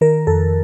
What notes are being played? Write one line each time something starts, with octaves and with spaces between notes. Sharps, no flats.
D#3 A#4
F2 A4